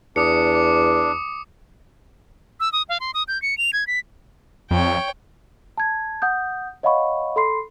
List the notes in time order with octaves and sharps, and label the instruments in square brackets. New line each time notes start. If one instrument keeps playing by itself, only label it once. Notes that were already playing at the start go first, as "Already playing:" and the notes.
[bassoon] E2 [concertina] D4 [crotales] D6 D#6 C#7
[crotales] D6
[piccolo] E6
D#6
F5
C6
D#6
G6
C#7
F7
G#6
B6
[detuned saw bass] F2 [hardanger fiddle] C#5 G5
[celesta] A5 G#6
F#5 D#6 G6
C#5 D#5 F5 F#5 B5 C#6
A4 B5 C6 C7